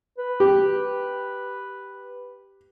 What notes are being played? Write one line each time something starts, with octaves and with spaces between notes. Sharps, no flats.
B4
G4